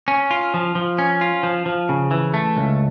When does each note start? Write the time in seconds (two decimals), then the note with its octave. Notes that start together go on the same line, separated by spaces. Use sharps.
0.08 C#4
0.31 F4
0.54 F3
0.75 F3
0.98 C#4
1.21 F4
1.43 F3
1.66 F3
1.89 C#3
2.11 E3
2.34 A3
2.57 C#2